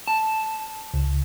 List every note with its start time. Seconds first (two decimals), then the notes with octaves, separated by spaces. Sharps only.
0.08 A5
0.94 C#2